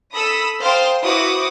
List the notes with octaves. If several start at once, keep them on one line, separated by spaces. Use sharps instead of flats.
A4 B5 D#6 E6
C5 F5 G5 A5 C6 D#6
E4 F#4 B4 C5 D6 D#6